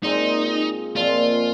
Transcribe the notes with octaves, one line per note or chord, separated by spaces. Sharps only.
A#2 G#3 C4 D#4
A#2 F3 G#3 C4 F4